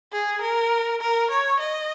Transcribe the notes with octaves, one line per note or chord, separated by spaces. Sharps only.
G#4
A#4
A#4
C#5
D#5